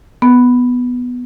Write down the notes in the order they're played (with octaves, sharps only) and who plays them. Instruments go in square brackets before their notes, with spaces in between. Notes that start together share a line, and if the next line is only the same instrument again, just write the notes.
[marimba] B3